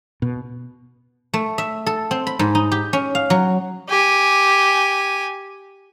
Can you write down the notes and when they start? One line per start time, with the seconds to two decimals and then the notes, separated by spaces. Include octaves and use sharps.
0.22 B2
1.34 A3
1.58 E5
1.86 A4
2.11 C4
2.27 B5
2.39 G#2
2.55 D#4
2.72 G4
2.93 C#4
3.15 F5
3.30 F#3
3.89 G4 G#5